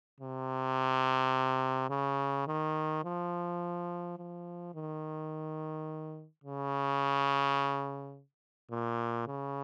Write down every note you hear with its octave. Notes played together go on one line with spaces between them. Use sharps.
C3
C#3
D#3
F3
F3
D#3
C#3
A#2
C#3